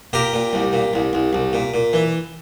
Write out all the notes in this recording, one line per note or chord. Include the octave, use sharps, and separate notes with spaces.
A#2 G4 A#4
A#2
C2
A#2
C2
C2
C2
A#2
A#2
E3